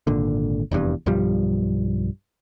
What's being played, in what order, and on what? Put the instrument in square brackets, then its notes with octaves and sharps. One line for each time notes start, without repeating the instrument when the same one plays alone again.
[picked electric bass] G#1 A#2 D3
F1 E2 G2
B1 G2 F3 G3